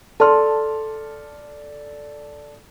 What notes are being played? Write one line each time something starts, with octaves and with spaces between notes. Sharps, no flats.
A4 D5 A5 C6 F6